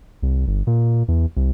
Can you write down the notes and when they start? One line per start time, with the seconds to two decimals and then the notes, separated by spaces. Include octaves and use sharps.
0.22 C2
0.48 G1
0.67 A#2
1.08 E2
1.37 C2